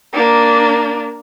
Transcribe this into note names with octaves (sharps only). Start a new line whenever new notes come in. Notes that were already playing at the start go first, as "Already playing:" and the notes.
A#3 D4